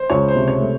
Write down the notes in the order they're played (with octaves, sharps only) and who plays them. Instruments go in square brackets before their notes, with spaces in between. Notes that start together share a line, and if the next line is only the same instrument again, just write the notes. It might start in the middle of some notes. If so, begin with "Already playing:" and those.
Already playing: [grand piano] C5
[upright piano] C#2 [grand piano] C#5
[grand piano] C5
[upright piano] C3
[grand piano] C#5
[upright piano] A3